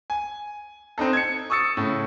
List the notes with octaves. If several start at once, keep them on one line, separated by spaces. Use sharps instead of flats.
G#5
C4 D4 D#4 A4
G#6 C#7
C#6 D#6 E6 A6 C#7
A2 C#3